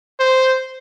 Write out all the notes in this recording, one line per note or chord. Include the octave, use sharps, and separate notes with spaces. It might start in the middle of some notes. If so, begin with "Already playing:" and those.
C5